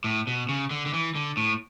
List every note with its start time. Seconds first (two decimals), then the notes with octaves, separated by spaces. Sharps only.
0.04 A2
0.27 B2
0.49 C#3
0.71 D3
0.86 D3
0.94 E3
1.15 D3
1.37 A2